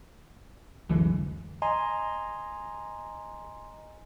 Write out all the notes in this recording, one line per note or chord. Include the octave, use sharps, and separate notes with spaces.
F1 C2 D3 E3 F#3 G#3
D#5 G#5 A#5 C6